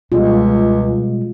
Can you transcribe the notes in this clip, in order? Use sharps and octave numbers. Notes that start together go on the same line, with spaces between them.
C#2 B2 G3 G#3 F4